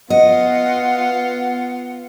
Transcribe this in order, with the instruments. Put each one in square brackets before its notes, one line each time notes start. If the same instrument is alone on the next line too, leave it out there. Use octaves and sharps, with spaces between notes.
[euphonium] B3 [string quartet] F4 [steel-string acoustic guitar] D#5 [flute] F#5